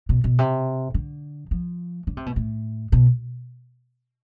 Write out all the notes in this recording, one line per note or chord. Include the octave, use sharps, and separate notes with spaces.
B2
B2
C3
D3
F3
D3
C3
B2
A2
B2